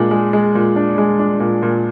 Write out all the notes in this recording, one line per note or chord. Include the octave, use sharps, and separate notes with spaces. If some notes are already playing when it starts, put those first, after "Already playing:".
Already playing: A#2 G#3 D4
G#3
G#3
A#2
D4
G#3
D4
A#2
A#2